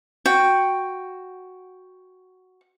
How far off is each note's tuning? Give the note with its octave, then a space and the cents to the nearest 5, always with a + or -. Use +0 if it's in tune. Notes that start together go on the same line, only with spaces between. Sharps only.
F#4 +0 G5 +0